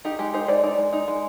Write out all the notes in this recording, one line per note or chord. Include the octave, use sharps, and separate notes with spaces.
D#4 G4
G#3 G4
D#4 C5
G#3 D5
D#4 D5
G#3
D#4
G#3